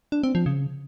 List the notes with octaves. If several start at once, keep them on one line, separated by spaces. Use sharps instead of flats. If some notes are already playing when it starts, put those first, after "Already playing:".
D4
C4
F3
C#3